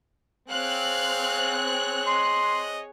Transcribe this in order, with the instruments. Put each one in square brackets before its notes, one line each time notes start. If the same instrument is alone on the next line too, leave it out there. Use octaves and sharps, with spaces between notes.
[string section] C4 F#6 [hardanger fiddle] G#4 C#5 [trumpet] F5
[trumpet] D#5 [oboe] C6